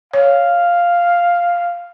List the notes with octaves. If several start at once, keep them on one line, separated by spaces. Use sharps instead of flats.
C#5 F5